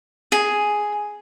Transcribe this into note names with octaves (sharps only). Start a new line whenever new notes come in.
G#4